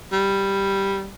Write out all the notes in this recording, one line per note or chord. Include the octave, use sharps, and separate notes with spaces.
G3